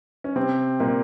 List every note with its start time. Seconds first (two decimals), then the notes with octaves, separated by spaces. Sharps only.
0.24 C#4
0.36 C3 C4
0.80 A#2 A#3